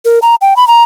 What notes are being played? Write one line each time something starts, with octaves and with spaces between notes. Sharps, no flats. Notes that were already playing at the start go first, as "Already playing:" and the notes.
A#4
A#5
G5
B5
A#5